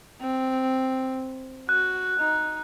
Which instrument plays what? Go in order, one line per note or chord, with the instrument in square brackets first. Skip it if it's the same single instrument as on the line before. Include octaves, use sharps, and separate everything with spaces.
[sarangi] C4
[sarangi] F#4 [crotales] F#6
[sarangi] D#4